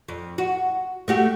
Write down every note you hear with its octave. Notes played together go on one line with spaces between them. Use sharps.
F2
F#4
A3 F#4 G4